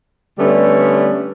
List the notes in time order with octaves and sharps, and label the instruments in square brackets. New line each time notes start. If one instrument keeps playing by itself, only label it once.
[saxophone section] D3 G3 A3 B3 C#4